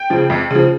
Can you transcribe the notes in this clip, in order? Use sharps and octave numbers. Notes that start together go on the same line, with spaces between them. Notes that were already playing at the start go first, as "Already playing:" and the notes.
Already playing: G5
C#3 F3
F2
C#3 F3